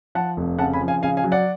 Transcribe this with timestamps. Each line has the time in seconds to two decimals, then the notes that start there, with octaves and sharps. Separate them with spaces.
0.15 F3 F#5 A5
0.37 F1
0.58 C#3 F#5 A5
0.73 G#5 B5
0.81 F3
0.88 F5 G#5
1.03 C#3 F5 G#5
1.17 F5 G#5
1.24 F#3
1.32 D5 F#5